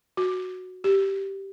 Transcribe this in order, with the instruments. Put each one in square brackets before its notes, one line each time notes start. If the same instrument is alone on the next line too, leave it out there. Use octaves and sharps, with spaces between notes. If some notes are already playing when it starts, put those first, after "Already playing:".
[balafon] F#4
G4